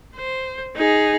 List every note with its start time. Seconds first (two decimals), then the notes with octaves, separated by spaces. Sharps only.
0.15 C5
0.76 D#4 G#4